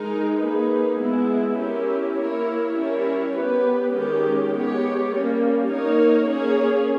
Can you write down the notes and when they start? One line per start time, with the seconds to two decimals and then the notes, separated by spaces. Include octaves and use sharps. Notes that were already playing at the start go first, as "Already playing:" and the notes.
Already playing: G#3 D#4 A#4
0.41 A#3 D#4 G#4 B4
0.99 G#3 B3 E4 G#4
1.59 C#4 E4 G4 A#4
2.17 A#3 E4 A#4 C#5
2.75 G3 C#4 E4 A#4 C#5
3.35 B3 G4 B4
3.93 D#3 G#3 C#4 G4
4.51 G#3 B3 G4 C#5
5.11 G3 A#3 C#4
5.69 A#3 D#4 A#4 C#5
6.29 A#3 C#4 G#4 C#5